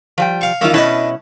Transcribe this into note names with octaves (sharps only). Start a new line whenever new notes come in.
F3 G3 G5
F5 C#6
D#3 E3 A#3 C#4 F4
B2 C#4 D4 E4 B4 D#5